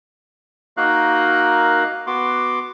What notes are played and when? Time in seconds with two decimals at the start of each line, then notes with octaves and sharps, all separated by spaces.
0.77 A#3 D#4 F#4 A#4 F5 F#6
2.07 B3 F#4 C6 D6